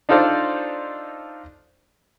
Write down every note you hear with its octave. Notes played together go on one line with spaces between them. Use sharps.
D4 D#4 F4 A4 C5 D5